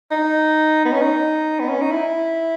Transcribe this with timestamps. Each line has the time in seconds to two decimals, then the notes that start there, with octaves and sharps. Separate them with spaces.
0.11 D#4
0.85 B3
0.93 C#4
1.01 D#4
1.60 B3
1.69 C#4
1.81 D#4
1.91 E4